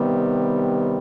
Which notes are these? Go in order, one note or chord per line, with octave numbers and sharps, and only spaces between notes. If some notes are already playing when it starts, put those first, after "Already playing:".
Already playing: C3 D#3 G3 B3